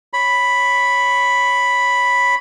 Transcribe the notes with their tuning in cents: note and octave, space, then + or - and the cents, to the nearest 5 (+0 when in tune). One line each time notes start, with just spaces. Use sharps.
C#5 +0 B5 +0